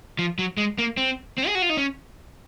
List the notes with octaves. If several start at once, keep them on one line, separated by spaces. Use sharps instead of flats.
F3
F#3
G#3
A#3
C4
C4
G#4
F#4
F4
D#4
C#4